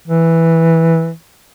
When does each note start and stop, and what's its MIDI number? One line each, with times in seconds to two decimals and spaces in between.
0.08 1.11 52